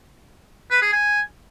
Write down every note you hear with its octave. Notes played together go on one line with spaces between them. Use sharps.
B4
G#4
G#5